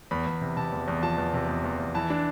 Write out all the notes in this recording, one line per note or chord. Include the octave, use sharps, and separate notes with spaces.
E2 B5
E2
C3
C3 A5
E2
E2
F3 A5
E2
C3
E2
E2
E2
E3 A5
D4